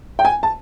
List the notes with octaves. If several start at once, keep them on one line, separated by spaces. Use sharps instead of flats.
G5
G#5
A5